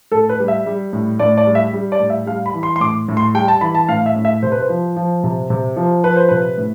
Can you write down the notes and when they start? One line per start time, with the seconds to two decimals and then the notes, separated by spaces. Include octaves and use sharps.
0.11 A2 A4
0.29 B4
0.39 G3
0.48 E5
0.66 G3
0.93 A2
1.19 A2 D5
1.37 D5
1.47 G3
1.55 E5
1.73 G3
1.92 D5
2.00 A2
2.10 E5
2.27 G3 F5
2.46 B5
2.54 E3
2.63 C6
2.76 C6
2.80 A2 D6
3.08 A2
3.17 C6
3.34 G3 G5
3.48 A5
3.61 E3 B5
3.75 A5
3.89 A2 F5
4.06 E5
4.16 A2
4.25 E5
4.42 C3 C5
4.52 B4
4.61 C5
4.69 F3
4.96 F3
5.24 C3
5.50 C3
5.77 F3
6.04 F3 B4
6.16 C5
6.28 C3 B4
6.58 A2